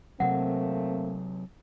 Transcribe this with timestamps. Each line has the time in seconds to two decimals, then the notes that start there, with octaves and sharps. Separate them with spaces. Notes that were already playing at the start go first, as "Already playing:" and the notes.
0.20 C3 F#3 A3 A#3 C4 F#5